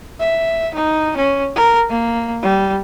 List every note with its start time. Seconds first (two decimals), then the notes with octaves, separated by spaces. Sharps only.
0.20 E5
0.75 D#4
1.16 C#4
1.56 A#4
1.89 A#3
2.43 G3